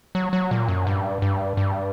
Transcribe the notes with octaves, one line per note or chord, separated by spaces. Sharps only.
F#3
F#3
A#2
F#2
G2
G2
G2